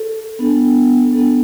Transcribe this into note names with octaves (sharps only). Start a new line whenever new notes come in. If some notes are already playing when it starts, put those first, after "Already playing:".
Already playing: A4
B3 D4 A4
B3 D4 A4